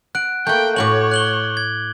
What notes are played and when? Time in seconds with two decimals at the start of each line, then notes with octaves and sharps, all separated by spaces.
0.15 F#5 F#6 D7
0.47 A3 A#3 G5 B5 G6
0.76 A2 F#4 C#5 G#5 D6 G6 F#7
1.11 F#6 F#7 G7
1.57 G#6